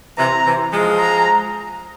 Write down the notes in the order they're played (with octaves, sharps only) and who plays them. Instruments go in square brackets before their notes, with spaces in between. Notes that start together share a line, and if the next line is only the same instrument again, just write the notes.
[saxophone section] C3 E3 [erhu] A#5
[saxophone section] C3 E3
F3 G#3
[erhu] A#5